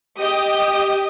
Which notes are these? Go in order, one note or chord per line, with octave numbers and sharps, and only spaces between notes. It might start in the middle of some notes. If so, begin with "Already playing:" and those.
G4 D#5 G5 D#6